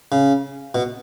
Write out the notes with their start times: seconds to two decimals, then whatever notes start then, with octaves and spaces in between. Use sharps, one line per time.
0.12 C#3
0.75 B2